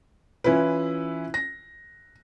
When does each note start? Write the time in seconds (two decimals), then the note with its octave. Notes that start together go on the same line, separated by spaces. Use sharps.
0.44 E3 C#4 E4 F4 B4
1.34 A#6